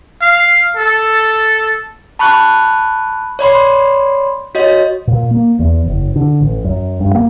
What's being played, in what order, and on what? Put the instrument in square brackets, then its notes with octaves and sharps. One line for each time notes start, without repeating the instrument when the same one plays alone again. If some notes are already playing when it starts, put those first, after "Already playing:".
[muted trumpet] F5
A4
[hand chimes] A5 B5 C#6 F#6
C#5 D5 B5 C6
F#4 C#5 D#5
[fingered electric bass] A#2
A#3
E2
F#1
D3
A1
F#2
G2
A#3